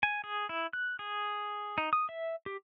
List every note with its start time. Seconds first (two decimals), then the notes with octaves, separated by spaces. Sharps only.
0.03 G#5
0.24 G#4
0.49 E4
0.73 F#6
0.99 G#4
1.78 D#4
1.93 D#6
2.09 E5
2.46 G4